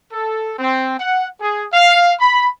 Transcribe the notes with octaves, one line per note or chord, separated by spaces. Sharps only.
A4
C4
F#5
G#4
F5
B5